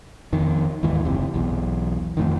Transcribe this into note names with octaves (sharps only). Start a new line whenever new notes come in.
F2 D#3
D#2 G#2 E3
F#1 C3
B1 E2
F2 A2 D#3